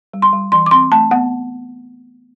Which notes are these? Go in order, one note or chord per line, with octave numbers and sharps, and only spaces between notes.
G3
C6
G3
E3 C6
D6
C4 C6
A3 A5
B3 F#5